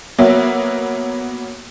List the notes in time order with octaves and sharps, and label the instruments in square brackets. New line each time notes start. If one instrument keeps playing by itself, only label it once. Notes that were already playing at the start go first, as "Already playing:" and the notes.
[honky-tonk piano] F#3 A#3 B3 E5